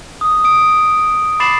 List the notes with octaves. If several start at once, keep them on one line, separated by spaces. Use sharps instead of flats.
D#6
D#6 D7
B5 D6 A6 C7 E7 F#7